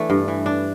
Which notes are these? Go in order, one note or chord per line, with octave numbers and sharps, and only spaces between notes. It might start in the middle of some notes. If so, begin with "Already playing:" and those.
Already playing: E3 A3 D4
G2
E3
D4